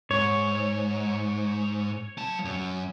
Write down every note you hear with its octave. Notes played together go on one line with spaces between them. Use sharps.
G#2 C#5
F#3 A5
F#2